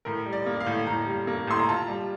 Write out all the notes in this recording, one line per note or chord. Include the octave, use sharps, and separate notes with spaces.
A2 A#4
G3
D5
A#3
F5
A2
A2 A#5
G3
A#3
A2 C6
A#5
F4 A5
G3